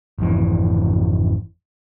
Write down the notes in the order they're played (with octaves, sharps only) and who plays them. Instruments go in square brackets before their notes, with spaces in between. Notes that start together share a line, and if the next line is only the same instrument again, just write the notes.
[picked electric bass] G#1 F2 E3